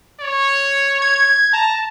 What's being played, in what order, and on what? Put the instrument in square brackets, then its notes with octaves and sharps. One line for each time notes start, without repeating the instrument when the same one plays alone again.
[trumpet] C#5
[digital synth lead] G#6
[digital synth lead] A5 [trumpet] A#5